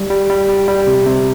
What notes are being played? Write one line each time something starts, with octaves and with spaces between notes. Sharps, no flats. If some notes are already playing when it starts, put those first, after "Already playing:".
Already playing: G3
G3
G3
G3
G3
C3
C3